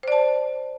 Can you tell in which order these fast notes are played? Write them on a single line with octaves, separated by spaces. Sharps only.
C5 D5 A5